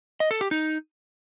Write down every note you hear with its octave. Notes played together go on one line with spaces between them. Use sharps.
D#5
A4
G4
D#4